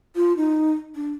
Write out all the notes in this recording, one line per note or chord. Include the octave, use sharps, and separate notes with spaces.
F4
D#4
D4